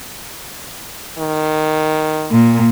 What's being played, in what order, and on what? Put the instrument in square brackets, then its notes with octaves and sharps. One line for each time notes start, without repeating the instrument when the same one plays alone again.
[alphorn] D#3
[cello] A#2